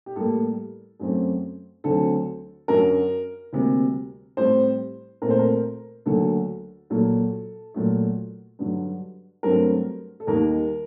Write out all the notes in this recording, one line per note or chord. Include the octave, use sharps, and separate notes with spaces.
G4
A2 G3 A#3 A4
F#2 F#3 A3 C4
D2 D3 F#3 C4 A4
F#2 D3 F#3 A#4
D2 C3 G3 A#3
A2 G3 C4 C5
A#2 A3 C4 A#4
C5
A#4
D2 D3 F#3 A#3 A4
A#2 F#3 A#3 A4
A#2 F#3 A3
G2 D3 F#3
G2 F#3 A3 C4 A#4
A4
D#2 D#3 G3 A#3 A#4